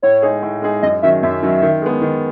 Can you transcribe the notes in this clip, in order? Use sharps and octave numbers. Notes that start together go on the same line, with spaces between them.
A2 C#5
G#3 D#4 G#4
A2
G#3 D#4 G#4
F#2 D#5
D#3 F#3 C#4 E5
F#2 E5
D#3 F#3 C#4
D#3
G#3 B3
D#3